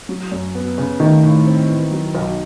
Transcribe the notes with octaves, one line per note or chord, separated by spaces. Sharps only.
F#3
F#2
B3
C#3
D#3 A3
A2
C4
E3
F#3
B1